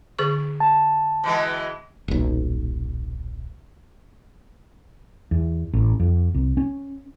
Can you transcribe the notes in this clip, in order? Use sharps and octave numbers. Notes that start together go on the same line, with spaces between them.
D3 G#4 C#6
A5
B2 E3 G#3
D#1 B1
E2
A1
F2
C2
C#4